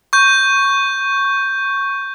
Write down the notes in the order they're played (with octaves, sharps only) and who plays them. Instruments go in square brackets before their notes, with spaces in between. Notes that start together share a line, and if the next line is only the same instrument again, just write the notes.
[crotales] C#6 G6